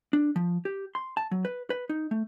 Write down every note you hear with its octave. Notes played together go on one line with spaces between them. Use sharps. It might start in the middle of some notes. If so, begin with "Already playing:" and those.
D4
F3
G4
C6
A5
F#3
B4
B4
D#4
A3